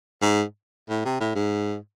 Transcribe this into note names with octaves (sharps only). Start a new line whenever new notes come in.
G#2
A2
C3
A2
G#2